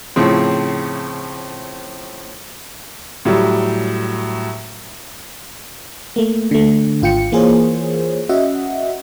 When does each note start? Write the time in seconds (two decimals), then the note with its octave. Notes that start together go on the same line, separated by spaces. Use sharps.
0.16 A2 C#3 F3 C4
3.25 A2 F#3 G3
6.16 A3 A#3
6.51 D3 A3
7.02 G#1 F4 G5 C#7
7.32 E3 A#3 F4 G#4 C5 C#5
8.29 C#4 F#4 D#5 E5 F#5